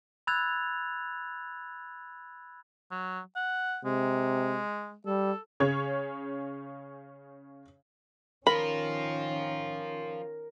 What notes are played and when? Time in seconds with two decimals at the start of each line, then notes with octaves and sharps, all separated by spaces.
0.27 B5 E6 F#6 G#6 A6 F7
2.91 F#3
3.36 F#5
3.85 C3 G#3
5.06 G3 A4
5.60 C#3 C#4 G#4 C#5 G#6
8.47 D#3 F3 C#4 F4 A#4 B5